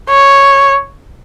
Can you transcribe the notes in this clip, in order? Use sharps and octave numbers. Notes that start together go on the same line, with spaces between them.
C#5